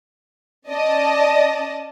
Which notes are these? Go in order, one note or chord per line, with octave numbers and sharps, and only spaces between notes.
C#4 D5 D#5 A5